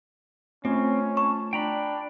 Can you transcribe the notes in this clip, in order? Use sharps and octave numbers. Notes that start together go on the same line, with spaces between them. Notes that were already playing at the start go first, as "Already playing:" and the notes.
A3 C4 C#4 F4
A5 C#6
D4 G5 A#5 B5